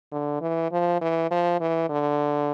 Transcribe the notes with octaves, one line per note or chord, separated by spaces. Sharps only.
D3
E3
F3
E3
F3
E3
D3